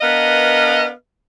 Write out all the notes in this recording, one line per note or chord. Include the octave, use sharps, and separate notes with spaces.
B3 D4 A#4 B4 D#5 F5